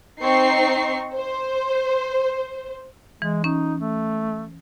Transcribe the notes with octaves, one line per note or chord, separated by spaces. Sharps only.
C4 D#4 C#6 C7
C5
E3 G#3
C#4 D#4
A3